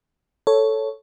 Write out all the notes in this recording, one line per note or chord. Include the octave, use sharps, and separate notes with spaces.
A4 C#5